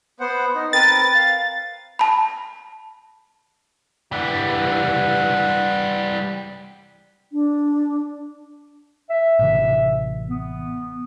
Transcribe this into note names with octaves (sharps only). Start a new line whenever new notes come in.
B3 C5 F#5
D#4
C4 A#4 B4 A6
F5
A5 B5
G2 E3 G3 F#5
D4
E5
A1 C3 E3
B3